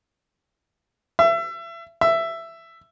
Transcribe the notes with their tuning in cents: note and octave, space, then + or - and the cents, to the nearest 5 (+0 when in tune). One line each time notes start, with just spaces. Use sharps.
E5 +30
E5 +10